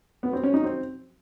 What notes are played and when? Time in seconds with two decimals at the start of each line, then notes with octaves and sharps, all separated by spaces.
0.23 B3
0.33 C4
0.43 C#4
0.54 D#4
0.64 C4